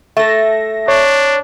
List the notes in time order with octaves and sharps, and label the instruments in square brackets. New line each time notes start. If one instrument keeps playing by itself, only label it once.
[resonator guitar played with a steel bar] A3 A4 [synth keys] E5 A#6
[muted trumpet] D4 [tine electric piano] C#5